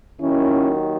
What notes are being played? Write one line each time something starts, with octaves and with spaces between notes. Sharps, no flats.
D#2 D#3 F#3 C#4 E4